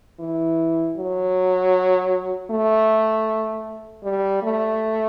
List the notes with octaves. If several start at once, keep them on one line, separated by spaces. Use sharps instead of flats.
E3
F#3
A3
G3
A3